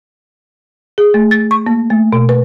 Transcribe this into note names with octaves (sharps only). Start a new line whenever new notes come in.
G#4
A3
A6
C#6
A#3
A3
B2
B4